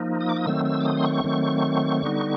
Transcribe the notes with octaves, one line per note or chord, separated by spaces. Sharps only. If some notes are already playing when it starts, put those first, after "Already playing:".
Already playing: F3 A#3 D#4
D#6
D6
D#6
D#3 F#3 A3 C4 E6
E6
D6
D#6
C6
C#6
D#3 F#3 A3 C4
D3 G3 B3 D#4